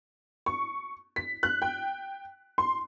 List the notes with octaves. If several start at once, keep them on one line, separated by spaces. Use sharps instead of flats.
C#6
B6
F#6
G5
C6